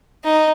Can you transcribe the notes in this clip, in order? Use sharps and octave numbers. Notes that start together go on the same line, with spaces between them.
D#4